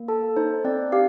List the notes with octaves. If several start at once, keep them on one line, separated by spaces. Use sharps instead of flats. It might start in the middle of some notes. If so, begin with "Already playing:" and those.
Already playing: A#3
A4 A5
D#4 C5
C4 D5
G4 F5